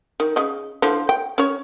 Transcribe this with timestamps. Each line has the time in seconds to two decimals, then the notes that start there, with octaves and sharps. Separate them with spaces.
0.20 D#3
0.36 C#3 D#5
0.82 D3 E3 F3
1.09 G5
1.38 C#4 C#5